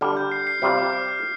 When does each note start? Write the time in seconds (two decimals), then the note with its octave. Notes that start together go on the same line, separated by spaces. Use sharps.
0.01 D3 G3 D4 F6
0.17 G6
0.32 C7
0.47 C7
0.62 C3 G3 C4 F4 D5 C7
0.78 D6
0.93 F6
1.08 F6